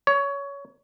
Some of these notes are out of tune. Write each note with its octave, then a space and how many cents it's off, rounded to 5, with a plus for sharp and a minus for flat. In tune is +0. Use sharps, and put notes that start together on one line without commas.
C#5 +20